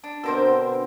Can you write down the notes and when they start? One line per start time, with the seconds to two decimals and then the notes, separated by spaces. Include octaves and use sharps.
0.04 D4
0.24 B2 D3 C4 A4 A#4 C5